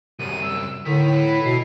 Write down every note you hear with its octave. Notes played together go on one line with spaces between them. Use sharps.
C2 F#2 D#7
E6
A2 D3 D#3 B6
E3 B5
B2 C7